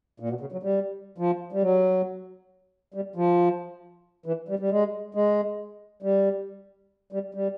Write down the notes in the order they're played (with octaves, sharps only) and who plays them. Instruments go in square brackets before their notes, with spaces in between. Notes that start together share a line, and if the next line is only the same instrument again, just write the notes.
[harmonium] A#2
B2
C#3
F#3
G3
F3
G3
F#3
G3
F3
E3
G3
G3
G#3
G#3
G3
G3
G3